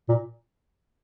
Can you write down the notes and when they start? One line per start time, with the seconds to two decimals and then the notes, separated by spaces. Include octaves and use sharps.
0.09 A#2